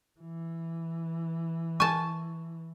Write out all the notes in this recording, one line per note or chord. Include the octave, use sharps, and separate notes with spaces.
E3
G#5 A5 C#6